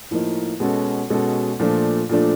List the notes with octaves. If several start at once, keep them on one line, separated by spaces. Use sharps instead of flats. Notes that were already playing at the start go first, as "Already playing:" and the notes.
A2 F3 A#3 D#4
B2 G#3 C#4 F#4 A4
B2 G#3 C#4 F#4 A4
A#2 F3 A3 D4
A#2 F3 A3 D4